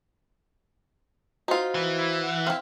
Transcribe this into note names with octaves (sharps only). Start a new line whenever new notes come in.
D#4 F4 F#4 C5 F5
E3
E4
F#5
C4 E4 F5